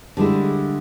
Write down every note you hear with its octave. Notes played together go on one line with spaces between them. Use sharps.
D3 G3 G#3 E4